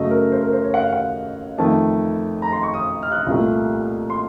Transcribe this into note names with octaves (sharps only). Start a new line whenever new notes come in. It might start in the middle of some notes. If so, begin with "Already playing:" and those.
Already playing: F#2 C#3 F#3 A3 D#5
A#4
C5
A#4
C5
C#5
F#5
F5
F#5
F2 D#3 A3 A5
A#5
C6
C#6
D#6
F6
F#6
C2 A#2 A3
C6